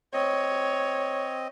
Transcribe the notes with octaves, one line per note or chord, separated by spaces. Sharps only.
C4 C#5 D#5